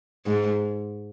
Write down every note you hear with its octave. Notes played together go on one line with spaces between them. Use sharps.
G#2